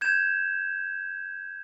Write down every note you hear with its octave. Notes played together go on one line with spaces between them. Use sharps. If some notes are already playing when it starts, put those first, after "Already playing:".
G6 G#6 E7